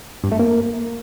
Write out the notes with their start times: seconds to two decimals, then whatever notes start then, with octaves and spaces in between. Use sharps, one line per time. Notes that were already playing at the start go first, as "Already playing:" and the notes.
0.24 G2
0.31 A3
0.39 A#3